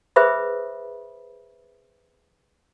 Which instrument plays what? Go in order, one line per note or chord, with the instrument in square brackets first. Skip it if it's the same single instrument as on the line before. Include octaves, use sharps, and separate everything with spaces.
[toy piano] G#4 B4 C5 E5 B5 D#6